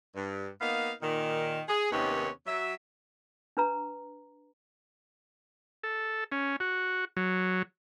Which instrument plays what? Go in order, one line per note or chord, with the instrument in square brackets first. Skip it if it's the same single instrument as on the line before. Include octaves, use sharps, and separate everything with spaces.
[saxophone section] G2
A#3 B3 D#4 F5
A#2 D#3
G#4
D#2 C3 D#3 B3 C#4
F#3 E5
[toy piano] D4 B4 A#5
[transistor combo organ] A4
C#4
F#4
F#3